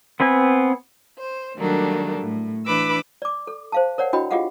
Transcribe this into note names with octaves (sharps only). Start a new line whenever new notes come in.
B3 C4 B4 G#5
C5
D#3 F#3 G3 A3 A#3 D4
A2
E3 D4 B4 B5 D6 E6
D5 D6
A4
C5 F5 A5
A#4 C#5 D5 F#5
D4 E4 F#4 D#5 G5 B5
F4 G4 G#4 D#5 F5 F#5